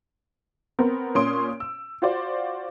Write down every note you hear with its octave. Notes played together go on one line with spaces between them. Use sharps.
B3 C4 A#4
A#2 C#4 C#5 C6 D#6 D7
E6
F4 F#4 C5 D5